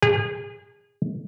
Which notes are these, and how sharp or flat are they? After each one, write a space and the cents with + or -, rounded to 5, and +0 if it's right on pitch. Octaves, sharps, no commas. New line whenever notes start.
G#4 -30